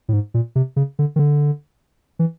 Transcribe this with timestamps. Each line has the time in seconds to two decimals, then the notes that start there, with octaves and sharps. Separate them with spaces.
0.09 A2
0.13 G#2
0.34 A#2
0.55 C3
0.76 C#3
0.99 D3
1.16 D#3
1.19 D3
2.19 E3